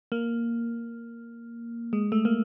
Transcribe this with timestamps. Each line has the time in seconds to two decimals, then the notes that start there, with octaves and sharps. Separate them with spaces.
0.12 A#3
1.93 G#3
2.12 A3
2.25 A#3